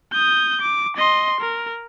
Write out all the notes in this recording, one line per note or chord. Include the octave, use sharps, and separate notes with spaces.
D#6 G6
D6
D#5 C6
A#4